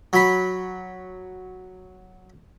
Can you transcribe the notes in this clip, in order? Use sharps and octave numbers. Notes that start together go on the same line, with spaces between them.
F#3 B5